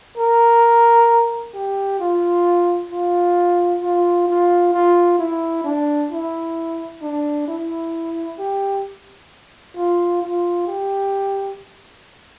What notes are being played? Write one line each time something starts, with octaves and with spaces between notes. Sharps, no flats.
A#4
G4
F4
F4
F4
F4
F4
E4
D4
E4
D4
E4
G4
F4
F4
G4